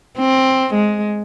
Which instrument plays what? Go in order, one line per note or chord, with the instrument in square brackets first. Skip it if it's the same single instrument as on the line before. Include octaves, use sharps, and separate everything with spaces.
[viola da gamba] C4
G#3